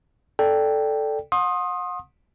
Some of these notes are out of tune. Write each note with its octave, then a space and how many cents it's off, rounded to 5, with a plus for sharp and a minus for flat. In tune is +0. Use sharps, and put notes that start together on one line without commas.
A4 +0 D5 +0 G5 +0
F#5 -40 C6 +30 D#6 +0